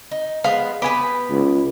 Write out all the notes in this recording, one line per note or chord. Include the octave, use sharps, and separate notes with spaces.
D#4
F3 G#3 B3 F5
B3 G4 B4 G#5
C#2